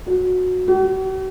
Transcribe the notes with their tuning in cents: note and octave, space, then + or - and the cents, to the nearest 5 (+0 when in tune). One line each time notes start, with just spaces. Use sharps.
F#4 -15
F#4 +45